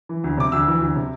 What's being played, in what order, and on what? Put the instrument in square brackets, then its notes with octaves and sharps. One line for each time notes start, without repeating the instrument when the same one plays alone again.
[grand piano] E3
D2
C3 D6
D2 E6
E3
D2
C3